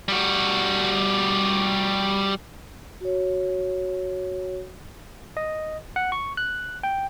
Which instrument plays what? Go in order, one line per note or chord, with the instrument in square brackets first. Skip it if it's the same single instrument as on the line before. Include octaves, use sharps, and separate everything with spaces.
[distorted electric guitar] G3 F#4
[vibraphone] F#4 C#5
[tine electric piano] D#5
F#5
C#6
F#6
G5